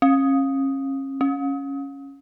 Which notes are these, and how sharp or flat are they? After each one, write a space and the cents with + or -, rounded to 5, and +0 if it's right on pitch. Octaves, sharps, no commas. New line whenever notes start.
C#4 -35
C#4 -5